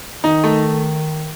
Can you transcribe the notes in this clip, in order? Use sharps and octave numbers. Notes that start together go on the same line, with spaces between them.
D#3 D#4
A3